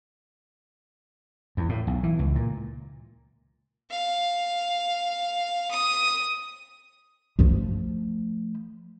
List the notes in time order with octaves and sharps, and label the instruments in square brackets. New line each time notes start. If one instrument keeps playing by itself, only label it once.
[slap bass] E2
A2
B1
E3
C#2
A#2
[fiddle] F5
D#6
[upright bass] F3 A3